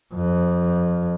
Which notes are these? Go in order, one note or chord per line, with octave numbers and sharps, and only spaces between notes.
F2